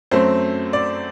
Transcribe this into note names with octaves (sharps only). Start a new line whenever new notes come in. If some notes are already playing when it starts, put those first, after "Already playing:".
F#2 F#3 A3 C4 C5
D5